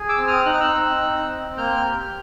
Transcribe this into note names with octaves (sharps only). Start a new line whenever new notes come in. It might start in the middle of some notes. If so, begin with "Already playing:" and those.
Already playing: G#4
D6 E6
C4
D#6 F6
D#4 F#6
F6
E6 F#6
C4
D#4
C4
A#3 F6 G6
G4